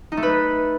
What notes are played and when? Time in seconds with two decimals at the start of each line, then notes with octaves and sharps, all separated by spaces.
0.12 D#4
0.17 A3
0.23 B4